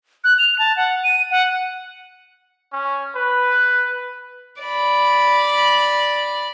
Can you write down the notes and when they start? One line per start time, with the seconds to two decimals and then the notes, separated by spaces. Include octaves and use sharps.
0.24 F#6
0.39 F7
0.59 A5
0.77 F#5
1.04 D#7
1.31 F#5
2.73 C#4
3.16 B4
4.62 D5 B5